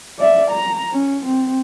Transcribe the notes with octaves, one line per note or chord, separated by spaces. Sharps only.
D5 E5
A#5
C#4
C4